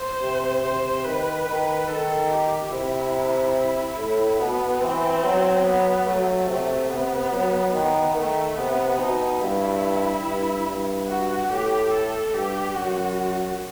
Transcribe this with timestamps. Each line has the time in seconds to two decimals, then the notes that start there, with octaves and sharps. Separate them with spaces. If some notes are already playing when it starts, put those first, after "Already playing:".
Already playing: C5
0.21 C3
0.63 C3 C5
1.05 D#3 B4
1.46 D#3
1.88 D#3 A4
2.31 G4
2.71 C3 E4
3.55 E4
3.97 A2
4.39 B2 B3
4.81 E3 C4
5.23 F#3
5.64 B3
6.06 F#3 A3
6.48 C3
6.89 C3 B3
7.32 F#3
7.73 D#3 B3
8.15 D#3 A3
8.57 C3 B3
8.99 B2 D#4
9.40 G2 E4
10.24 G2
10.66 G2
11.08 F#4
11.49 A2 G4
11.92 A4
12.33 G2 G4
12.75 F#2 F#4